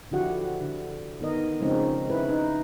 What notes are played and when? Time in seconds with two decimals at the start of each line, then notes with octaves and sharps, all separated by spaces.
0.11 D3 F3 E4 F#4 G4 F#5
0.61 D3
1.20 D#3 B3 A#4 D#5
1.61 C#3 F3 G#3 C4 C#4 D#4
2.10 C#4 E4 B4
2.29 D#4